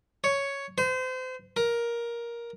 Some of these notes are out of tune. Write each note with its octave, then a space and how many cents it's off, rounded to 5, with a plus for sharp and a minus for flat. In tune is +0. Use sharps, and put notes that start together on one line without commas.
C#5 +5
C5 -35
A#4 +10